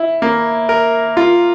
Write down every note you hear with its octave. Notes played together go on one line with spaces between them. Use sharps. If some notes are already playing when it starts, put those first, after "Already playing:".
Already playing: E4
A#3
A#4
F4